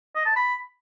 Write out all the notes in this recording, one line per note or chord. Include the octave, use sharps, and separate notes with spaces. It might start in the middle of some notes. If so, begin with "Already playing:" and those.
D#5
A5
B5